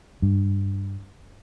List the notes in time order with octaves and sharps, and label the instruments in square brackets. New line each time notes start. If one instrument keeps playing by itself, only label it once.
[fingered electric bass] G2